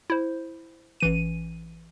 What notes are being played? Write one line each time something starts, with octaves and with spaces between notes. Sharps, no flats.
E4 C5
A1 E3 D#7